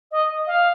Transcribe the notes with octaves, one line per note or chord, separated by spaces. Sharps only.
D#5
F5